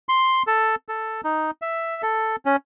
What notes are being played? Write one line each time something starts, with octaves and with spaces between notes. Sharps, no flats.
C6
A4
A4
D#4
E5
A4
C#4